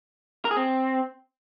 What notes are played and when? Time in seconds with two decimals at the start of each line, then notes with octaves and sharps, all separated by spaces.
0.45 A#4
0.51 G#4
0.57 C4